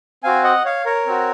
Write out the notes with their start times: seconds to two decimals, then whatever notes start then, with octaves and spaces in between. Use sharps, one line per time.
0.24 C4 F#4 F5 G#5
0.44 D#5 F#5
0.65 C#5 F5
0.86 A#4 C#5
1.07 C4 F#4